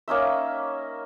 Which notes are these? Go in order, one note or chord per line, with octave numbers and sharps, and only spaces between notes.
A#3 C#4 D#4 E5